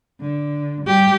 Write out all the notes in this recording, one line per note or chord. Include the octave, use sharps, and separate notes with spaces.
D3
G3 G4